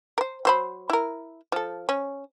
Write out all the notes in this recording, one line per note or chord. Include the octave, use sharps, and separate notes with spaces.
A#4 C5
F#3 C5 B5
E4 A#4
F3 A4
C#4